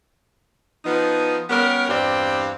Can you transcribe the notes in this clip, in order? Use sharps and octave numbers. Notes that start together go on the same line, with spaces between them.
F3 B3 D#4
G3 B3 C#4 A#4
E2 G2 C4 G4 D5 F5